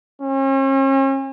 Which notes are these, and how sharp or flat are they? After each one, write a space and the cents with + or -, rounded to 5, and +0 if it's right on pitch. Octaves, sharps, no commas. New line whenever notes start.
C#4 -40